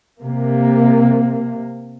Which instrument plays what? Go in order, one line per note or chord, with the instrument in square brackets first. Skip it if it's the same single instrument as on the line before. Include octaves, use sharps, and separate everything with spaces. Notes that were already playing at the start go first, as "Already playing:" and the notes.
[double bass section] C3 A#3